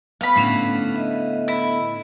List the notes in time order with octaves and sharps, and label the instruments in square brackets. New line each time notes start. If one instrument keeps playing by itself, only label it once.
[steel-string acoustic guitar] B3 [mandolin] F5 B5
[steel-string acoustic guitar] A2 D3 B3 [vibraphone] A3 C#4 D4
[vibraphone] D#5 E5
[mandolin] E4